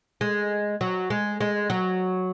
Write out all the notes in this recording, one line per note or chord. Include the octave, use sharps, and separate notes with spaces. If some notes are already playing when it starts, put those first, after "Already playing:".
G#3
F#3
G#3
G#3
F#3